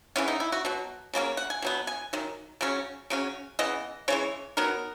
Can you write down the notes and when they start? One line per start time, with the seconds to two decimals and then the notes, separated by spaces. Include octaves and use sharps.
0.16 C#3 E3 B3 C#4
0.28 D#4
0.40 E4
0.52 F#4
0.65 B2 F#3
1.13 C#3 F#3 A#3 C#4
1.37 F#5
1.50 G#5
1.62 B2 F#3 B3
1.87 G#5
2.13 D#3 F#3
2.61 C#3 F#3 C#4
3.10 C#3 F#3 C#4
3.59 C#3 E3 B3 D#5
4.08 C#3 E3 G#3 C#5
4.57 D#3 F#3 B3 A#4